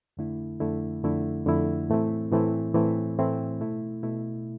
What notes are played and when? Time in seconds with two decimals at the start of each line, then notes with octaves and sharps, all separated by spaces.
0.17 F2 D3 A3 E4
0.60 F2 D3 A3 E4
1.04 F2 D3 A3 E4
1.46 F2 D3 A3 E4
1.90 A2 E3 A3 C4 E4
2.31 A2 E3 A3 C4 E4
2.74 A2 E3 A3 C4 E4
3.18 A2 E3 A3 C4 E4
3.60 B2 A3 E4
4.03 B2 A3 E4